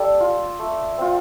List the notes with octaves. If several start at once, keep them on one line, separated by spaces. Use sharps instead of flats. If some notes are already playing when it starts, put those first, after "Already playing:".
Already playing: G3 A4 D5
F4
A3
C4 F4